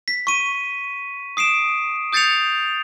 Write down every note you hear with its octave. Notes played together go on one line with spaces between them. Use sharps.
B6
C#6 D#7
D#6 C7 D7 E7
D#6 G6 A6 C7 C#7 F7